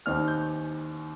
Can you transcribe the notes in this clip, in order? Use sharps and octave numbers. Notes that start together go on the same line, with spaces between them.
D#2 D#3 C4 D#4 F6
G6